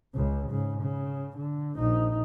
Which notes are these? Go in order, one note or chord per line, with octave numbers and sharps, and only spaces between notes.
C#2 C#3
G#2 C#3
C#3
D3
A#1 D#4